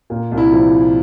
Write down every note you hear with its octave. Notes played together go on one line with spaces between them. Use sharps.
A#2
C2
E4
F3